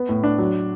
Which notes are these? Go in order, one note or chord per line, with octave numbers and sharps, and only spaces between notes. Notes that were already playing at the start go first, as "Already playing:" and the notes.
Already playing: B3
A2
D4
F#3